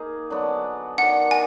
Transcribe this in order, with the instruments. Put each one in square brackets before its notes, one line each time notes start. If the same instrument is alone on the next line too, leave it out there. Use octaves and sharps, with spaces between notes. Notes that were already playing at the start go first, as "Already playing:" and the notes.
Already playing: [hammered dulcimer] A#3 D#4 G#4
D3 F#3 B3 D4
[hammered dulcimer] D#3 F#3 D4 [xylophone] F#5
[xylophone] G#5